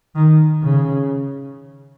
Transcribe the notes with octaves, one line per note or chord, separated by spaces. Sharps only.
D#3
C#3